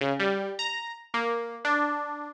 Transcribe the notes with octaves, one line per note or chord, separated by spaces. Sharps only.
C#3
G3
A#5
A#3
D4